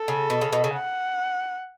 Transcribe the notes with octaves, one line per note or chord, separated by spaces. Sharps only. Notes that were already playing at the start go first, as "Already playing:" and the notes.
Already playing: A4
C#3
B2
C#3
B2
C#3
F#5